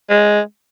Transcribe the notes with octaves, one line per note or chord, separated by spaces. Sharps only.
G#3